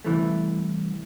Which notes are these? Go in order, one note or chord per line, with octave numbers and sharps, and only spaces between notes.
C2 E3 A3